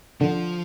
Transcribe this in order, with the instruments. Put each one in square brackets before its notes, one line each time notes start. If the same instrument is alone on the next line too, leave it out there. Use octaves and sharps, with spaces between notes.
[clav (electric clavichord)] D3 [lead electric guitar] F3